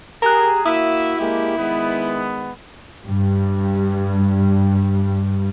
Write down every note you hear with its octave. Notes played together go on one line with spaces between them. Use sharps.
G4 G#4 A#4 A#5 F#6
A#3 E4 F#4 E5 D#6
G#3 A#3 G4
D#3 G#3 B3
G2 G3